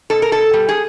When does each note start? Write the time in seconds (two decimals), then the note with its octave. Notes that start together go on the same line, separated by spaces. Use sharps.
0.10 B2 A4
0.22 A#4
0.31 B2 A4
0.53 G3
0.69 G#4